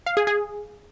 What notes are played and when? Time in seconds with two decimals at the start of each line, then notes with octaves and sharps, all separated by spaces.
0.06 F5
0.17 G#4
0.27 G#4